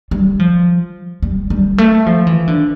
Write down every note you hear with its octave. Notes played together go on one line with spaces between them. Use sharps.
G3
F3
G3
G3
A3
F3
E3
D3